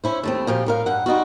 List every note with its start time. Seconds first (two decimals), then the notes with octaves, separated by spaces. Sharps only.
0.04 C#4 E4 C5
0.23 D#2 A3 C4
0.47 A#2 F3 G4 F5
0.66 A2 A#4 F5
0.86 G2 F#5
1.06 G3 D#4 F4 F#4